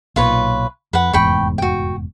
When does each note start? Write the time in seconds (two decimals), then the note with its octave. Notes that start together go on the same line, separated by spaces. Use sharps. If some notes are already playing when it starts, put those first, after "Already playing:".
0.16 B1 A#2 F4 B4 C#5
0.93 F2 B4 F#5
1.13 F1 E2 G#2 G5 B5 C#6
1.58 F#4 G5